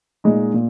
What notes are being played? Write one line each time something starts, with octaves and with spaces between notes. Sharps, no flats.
A#2 G#3 D#4
A#2